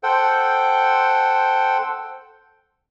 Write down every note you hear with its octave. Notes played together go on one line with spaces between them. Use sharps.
A4 C5 F#5 G5